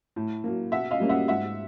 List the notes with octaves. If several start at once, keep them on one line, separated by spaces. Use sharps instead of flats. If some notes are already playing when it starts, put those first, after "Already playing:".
A2
F#3 A#3
B2 E5 F#5
D#5 F5
G3 A#3 C#4
E5 F#5
G#2 E5 F#5